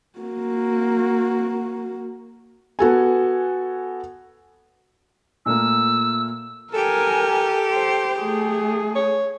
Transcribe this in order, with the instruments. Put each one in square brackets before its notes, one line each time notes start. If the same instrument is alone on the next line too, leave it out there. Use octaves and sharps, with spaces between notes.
[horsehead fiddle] A#3 F#4
[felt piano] B3 F#4 A4 G#5
[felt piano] A#2 A3 A#3 [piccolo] E6
[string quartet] G4 [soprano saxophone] A4 [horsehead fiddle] A#4 G#5
[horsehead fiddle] C5
A3 G#4
[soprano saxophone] C#5